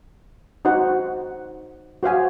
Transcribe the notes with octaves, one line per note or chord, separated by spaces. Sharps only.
D#4 F#4 C5 F#5
F#4 C5 F5 G#5